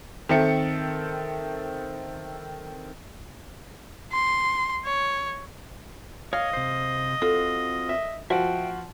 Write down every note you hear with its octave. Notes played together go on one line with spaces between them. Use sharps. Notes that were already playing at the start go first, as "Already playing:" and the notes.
D#3 C4 A4 E5 C#7
C6
C#5
C#5 D#5 F5
C3 C5
C4 F4 F#4 A4
E5
F3 F#4 E5 G5